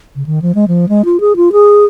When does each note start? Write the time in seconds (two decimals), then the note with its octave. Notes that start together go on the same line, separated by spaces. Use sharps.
0.15 C#3
0.26 D#3
0.42 F3
0.55 G#3
0.68 F3
0.89 G#3
1.05 F4
1.20 G#4
1.36 F4
1.52 G#4